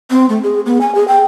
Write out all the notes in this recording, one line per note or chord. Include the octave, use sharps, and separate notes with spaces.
C4
A3
G#4
B3
G#5
G#4
G5